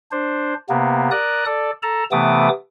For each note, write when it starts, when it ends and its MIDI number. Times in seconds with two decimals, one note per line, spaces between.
0.12 0.54 62
0.12 0.54 72
0.69 1.10 48
0.69 1.10 58
0.69 1.10 59
1.11 1.45 70
1.11 1.45 74
1.11 1.45 87
1.11 1.45 90
1.46 1.71 69
1.46 1.71 74
1.83 2.04 69
1.83 2.04 81
1.83 2.04 82
2.12 2.49 48
2.12 2.49 52
2.12 2.49 57
2.12 2.49 59
2.12 2.49 86
2.12 2.49 87